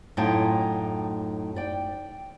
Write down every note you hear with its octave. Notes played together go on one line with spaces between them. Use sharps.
F#2 A2 D#4 F4 G5 A5
D5 G5